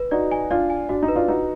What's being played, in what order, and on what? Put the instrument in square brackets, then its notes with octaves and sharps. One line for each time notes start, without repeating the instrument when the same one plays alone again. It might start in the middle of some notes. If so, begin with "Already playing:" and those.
Already playing: [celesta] B4
[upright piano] D#4 F#4 [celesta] D5
[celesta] G#5
[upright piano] D4 F4 [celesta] D5
[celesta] G#5
[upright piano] D4 [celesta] F#4
[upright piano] D#4
[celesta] B4
[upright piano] D4 F4
[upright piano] D#4 F#4 [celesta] B4